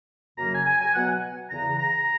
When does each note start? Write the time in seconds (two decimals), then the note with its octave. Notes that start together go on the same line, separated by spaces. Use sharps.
0.37 F#2 C#3 F#3 A#3 A#5
0.51 G#5
0.66 G#5
0.80 G#5
0.94 B2 F#3 B3 F#5
1.50 E2 C#3 E3 A#5
1.79 A#5